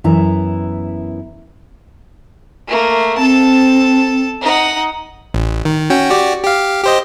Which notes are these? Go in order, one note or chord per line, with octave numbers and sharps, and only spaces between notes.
F#2 E3 B3 E4 A#5
A3 A#3
C4 A4 A5
D#4 F#5
A1
D#3
C#4 F#4 G5
F#4 G4 D5
G4 F5
G4 C5 D#5